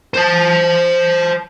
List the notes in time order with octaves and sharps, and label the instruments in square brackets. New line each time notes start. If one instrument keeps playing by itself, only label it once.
[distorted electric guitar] C5 A5